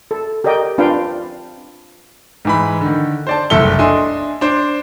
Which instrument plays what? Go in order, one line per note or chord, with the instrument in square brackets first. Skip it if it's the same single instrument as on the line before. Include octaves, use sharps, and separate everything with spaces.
[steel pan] A4
G4 A#4 D5 D#5 G5
C4 D4 F4 B4 F5 G5
[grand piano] G#2 E3 B5
D3 D#3
C5 D5 A5
F#1 C2 A4 E5 G7
D4 D#5 E5 G#5 C6
D4 C5 D6